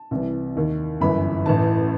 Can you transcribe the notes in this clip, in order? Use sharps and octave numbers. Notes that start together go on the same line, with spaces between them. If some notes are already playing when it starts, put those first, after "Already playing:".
Already playing: A5
C2 C3 E3
D#2 D#3
G1 F#2 E3 B5
A1 A2 E3 A5